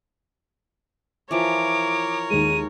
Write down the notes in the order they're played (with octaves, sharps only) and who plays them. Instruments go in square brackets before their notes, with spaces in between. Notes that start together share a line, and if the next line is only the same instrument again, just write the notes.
[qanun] E3 F3 [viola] A#4 C#5 [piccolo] D6
[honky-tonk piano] D#2 G#3 [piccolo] D#7